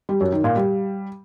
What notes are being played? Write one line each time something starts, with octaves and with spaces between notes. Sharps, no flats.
G3
F#2
D#3
A#2
G3